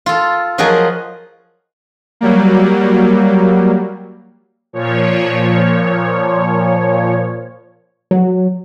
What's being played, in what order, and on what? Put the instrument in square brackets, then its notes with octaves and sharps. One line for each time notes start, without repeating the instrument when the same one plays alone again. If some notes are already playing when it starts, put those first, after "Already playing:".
[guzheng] F4 A4
F3 F#3 F#4 G#4 A#4 D#5
[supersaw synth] F#3 G3 A#3
A#2 F3 C#5
[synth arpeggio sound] F#3